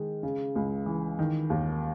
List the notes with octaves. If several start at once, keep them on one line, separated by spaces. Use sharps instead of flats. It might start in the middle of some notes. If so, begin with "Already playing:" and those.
Already playing: D#3 G#3
C#3
C#2
E3
D#3
D#2